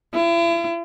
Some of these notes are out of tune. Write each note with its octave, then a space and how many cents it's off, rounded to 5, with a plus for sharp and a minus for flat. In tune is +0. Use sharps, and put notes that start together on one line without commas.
E4 +40